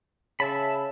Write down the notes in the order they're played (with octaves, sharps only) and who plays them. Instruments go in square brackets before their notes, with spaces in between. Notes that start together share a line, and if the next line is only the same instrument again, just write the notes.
[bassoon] C#3 [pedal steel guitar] E5 A5 B5